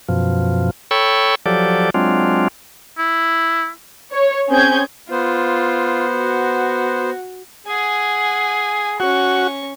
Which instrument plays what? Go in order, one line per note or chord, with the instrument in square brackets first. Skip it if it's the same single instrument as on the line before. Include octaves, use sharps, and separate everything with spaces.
[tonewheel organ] F#2 B2 F3
A4 C#5 G5 B5 C#6 E6
F3 F#3 G4 A4 D5
F#3 G#3 C4 D4 F4
[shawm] E4
[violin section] C#5
C4 C#4 G#4 G6 G#6
[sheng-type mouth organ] B3 C5 [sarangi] F4
[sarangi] F#4
[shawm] G#4 [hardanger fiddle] F#5 G#5
[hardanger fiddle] C#4 C#6 [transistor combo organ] F#4